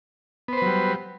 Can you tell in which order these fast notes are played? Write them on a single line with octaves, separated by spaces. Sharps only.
B3 C5 B4 F#3 G3